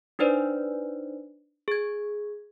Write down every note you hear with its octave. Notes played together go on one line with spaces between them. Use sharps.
D4 D#4 B4 C5 D5
G#4 G#6